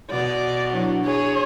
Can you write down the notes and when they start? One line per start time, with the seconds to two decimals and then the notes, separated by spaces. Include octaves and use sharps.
0.10 B2 D5
0.73 F#3 D4 E4
1.05 G#4 C#5